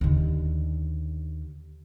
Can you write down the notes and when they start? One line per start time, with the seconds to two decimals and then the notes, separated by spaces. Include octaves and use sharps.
0.01 D#2 D3